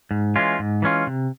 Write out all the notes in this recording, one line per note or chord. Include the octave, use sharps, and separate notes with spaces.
G#2
E3 G#3 C#4 F4
G#2
E3 G#3 C#4 F4
C3